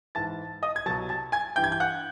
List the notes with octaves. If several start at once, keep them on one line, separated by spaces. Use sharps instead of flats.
G#2 E3 A5 A6
D#5 D#6
G#6
C2 B2 F#3 A5 A6
A5 A6
G#5 G#6
G2 E3 G5 G6
G#6
G6
F#5 F#6